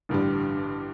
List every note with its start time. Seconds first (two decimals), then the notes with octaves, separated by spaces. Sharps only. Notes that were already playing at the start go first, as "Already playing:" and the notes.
0.09 A1 G2 D3 G3 D4